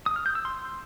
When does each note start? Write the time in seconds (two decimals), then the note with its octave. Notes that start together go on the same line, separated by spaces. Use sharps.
0.06 D#6
0.16 F6
0.26 G6
0.35 E6
0.45 C6